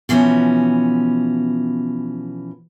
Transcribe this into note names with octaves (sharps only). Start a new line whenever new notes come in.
B2 E3 F3 B3 C#4 F#4